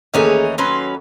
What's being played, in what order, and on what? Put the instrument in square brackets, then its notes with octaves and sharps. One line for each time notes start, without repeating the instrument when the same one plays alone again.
[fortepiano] D#2 A3 [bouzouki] E3 C#4 D#4 [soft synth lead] G#4
[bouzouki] F#3 C#4 B4 [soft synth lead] C6